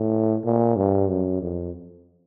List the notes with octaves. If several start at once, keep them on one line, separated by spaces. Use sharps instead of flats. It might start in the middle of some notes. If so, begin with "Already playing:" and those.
Already playing: A2
A#2
G2
F#2
F2